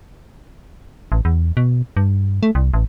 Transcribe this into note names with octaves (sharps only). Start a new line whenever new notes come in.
A1
E2
B2
G2
A3
C2
A1